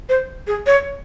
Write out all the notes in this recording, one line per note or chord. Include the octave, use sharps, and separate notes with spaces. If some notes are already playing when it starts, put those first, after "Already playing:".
C5
G#4
C#5